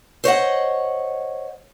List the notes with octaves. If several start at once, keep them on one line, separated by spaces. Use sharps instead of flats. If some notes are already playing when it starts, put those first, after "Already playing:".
C5 C#5 D#5 F#5